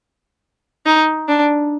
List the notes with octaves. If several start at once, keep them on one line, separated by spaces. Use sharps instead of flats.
D#4
D4